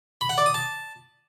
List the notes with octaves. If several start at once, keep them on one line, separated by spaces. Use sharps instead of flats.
B5
F#5
D5
D#6
A5